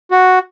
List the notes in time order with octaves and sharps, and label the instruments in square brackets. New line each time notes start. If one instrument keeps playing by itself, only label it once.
[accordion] F#4